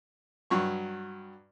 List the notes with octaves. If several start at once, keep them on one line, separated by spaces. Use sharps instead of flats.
G2 F#3 C#6